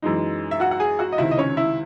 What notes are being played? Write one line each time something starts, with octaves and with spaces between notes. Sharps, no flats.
F#2 E3 G#3 D#4
E5
F#4 F#5
F#5
G#4 G#5
F#4 F#5
D#5
C#2 C3 D#3 E4 E5
D#5
C#4 C#5
E4 E5